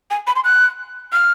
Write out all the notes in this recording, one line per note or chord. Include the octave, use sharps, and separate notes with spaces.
G#5
B5
C6
F#6
F6